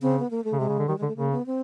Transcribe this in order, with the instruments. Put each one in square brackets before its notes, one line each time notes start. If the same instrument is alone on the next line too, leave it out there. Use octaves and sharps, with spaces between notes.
[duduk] C#3 [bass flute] C4
[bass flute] B3
A#3
A3
[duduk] C#3
[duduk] C3 [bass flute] G#3
[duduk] C#3
D3
[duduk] D#3 [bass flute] G3
[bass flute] G#3
[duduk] D3
[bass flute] A3
[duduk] C#3 [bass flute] A#3
[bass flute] B3
C4